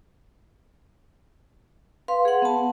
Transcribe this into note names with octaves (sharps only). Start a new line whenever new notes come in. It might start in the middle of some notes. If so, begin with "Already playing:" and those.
B4 F5 C6
G#4 F#5
B3 A5